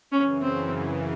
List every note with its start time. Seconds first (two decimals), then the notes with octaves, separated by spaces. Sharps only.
0.12 F#2 C#3 E3 C#4
0.42 C4